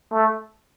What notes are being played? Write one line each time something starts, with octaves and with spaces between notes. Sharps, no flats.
A3